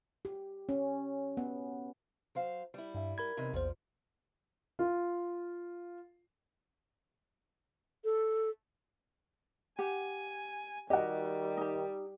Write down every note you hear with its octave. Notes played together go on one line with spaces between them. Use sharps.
G4
C#4
B3
F#3 C5 F5
G3 E4
G2 E5
A#4 B5 G#6
E2 C3 D#4
A#1 E2 A#2 F3 C5
F4
A4
G4 F#5 G#5
D#3 G3 F#4 G4 D#5 F#5
D#4 G4